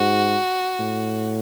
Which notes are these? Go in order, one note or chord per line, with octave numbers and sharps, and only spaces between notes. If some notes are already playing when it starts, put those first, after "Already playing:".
Already playing: G#2 F#4
A2